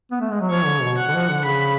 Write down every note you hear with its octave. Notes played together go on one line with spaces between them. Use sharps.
B3
A3
G#3
F#3
F3 C#5
D3
B2
F#5
D3
F3
D3
C#3 B5